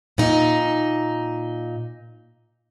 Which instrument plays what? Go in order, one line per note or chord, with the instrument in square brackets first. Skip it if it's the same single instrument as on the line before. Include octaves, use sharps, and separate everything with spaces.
[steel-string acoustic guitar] A#2 D#4